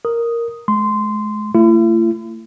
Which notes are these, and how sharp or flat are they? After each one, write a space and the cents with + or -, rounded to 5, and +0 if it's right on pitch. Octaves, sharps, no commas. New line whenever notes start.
A#4 +0 D#6 +0
G#3 +35 C6 -15
A3 +35 E4 +45